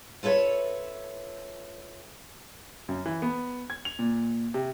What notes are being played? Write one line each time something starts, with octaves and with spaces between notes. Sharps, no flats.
F4 A4 B4 C#5 E5
F#2
E3
B3
G#6
F7
A#2
C3